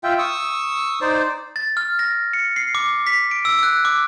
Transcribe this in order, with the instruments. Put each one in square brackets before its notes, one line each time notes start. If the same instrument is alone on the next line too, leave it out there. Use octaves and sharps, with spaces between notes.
[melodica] F4 E5 G5
C#6 D#6 E6
D#4 C5 D5
[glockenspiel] A6
F6
A#6
C#7
C7
D6
B6
D7
E6
F#6
D6